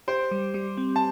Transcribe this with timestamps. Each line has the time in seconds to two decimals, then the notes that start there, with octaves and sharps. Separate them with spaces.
0.08 G4 C5
0.31 G3
0.54 G3
0.77 C4
0.96 A5